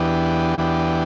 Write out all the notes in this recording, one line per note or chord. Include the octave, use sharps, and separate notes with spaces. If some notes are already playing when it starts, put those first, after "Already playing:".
Already playing: E2 E3 B3 D4 G4
E2 E3 B3 D4 G4